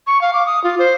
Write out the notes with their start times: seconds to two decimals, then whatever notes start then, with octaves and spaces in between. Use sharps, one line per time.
0.07 C#6
0.21 F5
0.33 D6
0.46 D#6
0.64 F4
0.79 C5